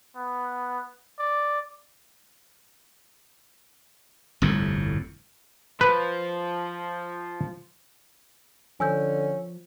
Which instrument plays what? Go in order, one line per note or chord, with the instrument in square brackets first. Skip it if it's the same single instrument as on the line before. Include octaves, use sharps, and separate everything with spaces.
[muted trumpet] B3
D5
[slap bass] G1 C2 F2 A2
[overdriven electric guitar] F3 [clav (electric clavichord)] B4
[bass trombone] D3 [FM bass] F3 [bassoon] C#4 [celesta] G#5 E6 G6